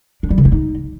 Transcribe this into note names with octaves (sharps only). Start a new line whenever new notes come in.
D4
G3
C#3
A#3
D#4